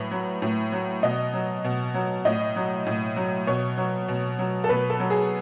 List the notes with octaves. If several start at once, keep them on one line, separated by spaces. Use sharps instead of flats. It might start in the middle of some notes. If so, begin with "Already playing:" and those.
Already playing: A2 F#3 B4
F#3
A2
F#3
B2 D#5
F#3
B2
F#3
A2 D#5
F#3
A2
F#3
B2 C#5
F#3
B2
F#3
A4
B2 B4
A4
F#3
G#4